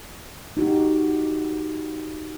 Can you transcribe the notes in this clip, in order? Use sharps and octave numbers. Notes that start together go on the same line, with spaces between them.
D#4 F#4 G4